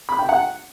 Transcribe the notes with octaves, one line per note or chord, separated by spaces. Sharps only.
B5
G5
F#5